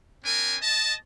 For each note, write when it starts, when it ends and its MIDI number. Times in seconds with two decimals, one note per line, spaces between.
0.24 0.56 60
0.24 0.56 62
0.24 0.56 70
0.24 0.56 80
0.62 0.94 75
0.62 0.94 81